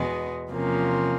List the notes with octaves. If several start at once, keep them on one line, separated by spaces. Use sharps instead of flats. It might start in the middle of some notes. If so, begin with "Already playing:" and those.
Already playing: E2 B2 G#3 B3
E2 C3 F3 A#3 C#4